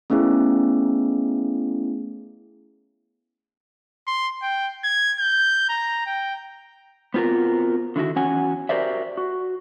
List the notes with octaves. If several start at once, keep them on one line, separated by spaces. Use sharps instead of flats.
A3 B3 C#4 E4 G#4
C6
G5
G#6
G6
A#5
G5
B3 C4 F4 F#4 A#4
D3 D#3 E4 F#4
E2 C#4 F#4 F#5 G#5
F#4 G4 A#4 C5 D5 E5
F#4